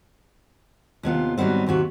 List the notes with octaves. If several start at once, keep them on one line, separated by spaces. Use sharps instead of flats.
D#2 C3 B3 F4
G#2 F#3 G3 B3 C4
D#2 G#2 C3 F#4